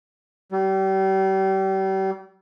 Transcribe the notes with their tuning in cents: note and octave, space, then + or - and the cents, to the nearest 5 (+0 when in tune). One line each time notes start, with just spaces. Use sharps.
G3 -35